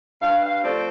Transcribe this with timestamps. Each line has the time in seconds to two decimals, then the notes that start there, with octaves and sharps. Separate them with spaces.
0.20 G2 F5
0.42 F5
0.62 F3 A3 C4 D5